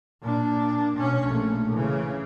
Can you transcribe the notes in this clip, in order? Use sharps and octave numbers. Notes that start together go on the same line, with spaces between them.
A#2 D4
B2 C#4
A#1 A3
C#3 E3